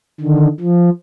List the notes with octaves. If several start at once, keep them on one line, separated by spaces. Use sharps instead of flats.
D3 D#3
F3